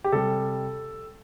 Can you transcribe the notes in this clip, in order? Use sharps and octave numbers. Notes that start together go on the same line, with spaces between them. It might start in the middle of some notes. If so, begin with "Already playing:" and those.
G4
C3 G3 A4